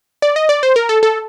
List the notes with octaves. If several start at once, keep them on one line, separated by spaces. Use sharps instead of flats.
D5
D#5
D5
C5
A#4
A4
A4